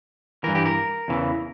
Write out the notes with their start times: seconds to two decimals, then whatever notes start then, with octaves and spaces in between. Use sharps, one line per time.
0.44 G2 E3 A#4
0.55 G4
0.65 A#4
1.08 E2 C#3 E3